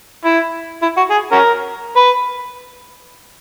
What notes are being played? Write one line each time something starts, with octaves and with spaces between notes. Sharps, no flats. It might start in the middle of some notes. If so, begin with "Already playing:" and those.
E4
E4
F#4
G#4
C#4 F#4 A#4
B4